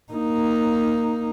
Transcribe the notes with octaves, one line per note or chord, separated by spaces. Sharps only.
A#3 D#4